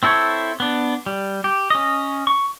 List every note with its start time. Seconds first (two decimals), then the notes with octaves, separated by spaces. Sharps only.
0.03 C4 E4 A4 C5 C#5
0.60 B3 D4
1.06 G3
1.44 G4
1.70 C#4 D#5
2.27 C#6